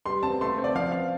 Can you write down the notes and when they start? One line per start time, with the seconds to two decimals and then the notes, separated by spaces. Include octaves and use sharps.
0.06 G3 C6
0.23 C4 A5
0.41 A3 C6
0.58 C4
0.64 D5
0.75 F3 F5
0.92 F5